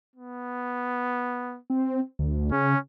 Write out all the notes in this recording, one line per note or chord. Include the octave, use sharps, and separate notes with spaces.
B3
C4
D2
C#3 C#4